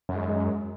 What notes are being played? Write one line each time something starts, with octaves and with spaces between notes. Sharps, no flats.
F#2
G#3
G#3